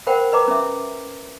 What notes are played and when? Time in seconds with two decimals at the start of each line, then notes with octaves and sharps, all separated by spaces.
0.07 A#4 C5 F#5 G5 B5
0.32 B4 D#5 A#5 D6
0.48 C#4 E5